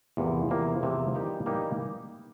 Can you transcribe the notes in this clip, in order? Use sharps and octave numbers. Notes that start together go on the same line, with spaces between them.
E2 C3 F3 A#3
E2 C3 F3 A#3
E2 C3 F3 A#3
E3 G3 A#3 D#4 G4
E3 G3 A#3 D#4 G4